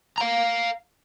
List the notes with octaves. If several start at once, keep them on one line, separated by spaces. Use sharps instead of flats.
F5 A#5